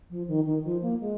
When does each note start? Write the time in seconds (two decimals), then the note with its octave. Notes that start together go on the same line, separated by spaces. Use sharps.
0.10 F3
0.28 D#3
0.46 D#3
0.64 F3
0.82 A#3
1.00 G#3